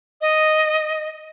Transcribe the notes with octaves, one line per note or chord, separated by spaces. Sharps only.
D#5